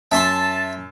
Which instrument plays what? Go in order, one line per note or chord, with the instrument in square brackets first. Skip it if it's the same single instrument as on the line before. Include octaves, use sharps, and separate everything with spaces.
[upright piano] F#2 [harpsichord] E5 C6 [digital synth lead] A5